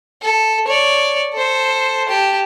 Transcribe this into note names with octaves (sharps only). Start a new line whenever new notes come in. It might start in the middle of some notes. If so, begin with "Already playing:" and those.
A4
C#5 D5
A4 C5
G4 A5